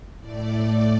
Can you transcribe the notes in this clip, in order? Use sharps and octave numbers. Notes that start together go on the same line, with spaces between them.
A2 A3 D5